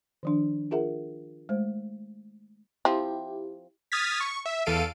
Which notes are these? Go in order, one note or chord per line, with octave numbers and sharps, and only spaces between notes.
D#3 F3 D4
F4 G#4 A#4 E5 F#5
G#3 A3 C5
F3 C4 E4 G4
D#6 F6 G#6 A6 B6
C#6
E5
E2 A4 F5 D7 D#7